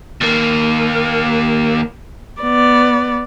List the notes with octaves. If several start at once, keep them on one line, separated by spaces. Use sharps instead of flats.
D#2 A#3
B3 D5